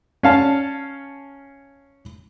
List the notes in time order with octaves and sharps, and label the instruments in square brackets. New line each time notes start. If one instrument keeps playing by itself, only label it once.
[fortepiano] C#4 F5 A5